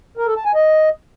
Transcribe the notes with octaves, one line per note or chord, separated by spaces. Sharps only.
A#4
A4
A5
G#5
D#5